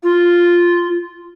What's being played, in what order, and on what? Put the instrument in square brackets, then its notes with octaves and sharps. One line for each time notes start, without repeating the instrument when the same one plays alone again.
[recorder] F4